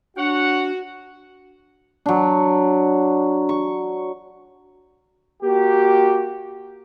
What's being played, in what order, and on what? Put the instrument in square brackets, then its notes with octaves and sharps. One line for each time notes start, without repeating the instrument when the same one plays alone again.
[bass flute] D4 [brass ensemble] F#4 [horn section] C#5 F#5
[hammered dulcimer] F#3 D4
C#6
[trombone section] A#3 F#4 G4